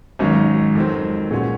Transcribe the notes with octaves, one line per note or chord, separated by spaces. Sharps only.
G#1 G#2 F#3 C#4
F2 D#3 F#3 C4
A#2 G#3 C#4 F#4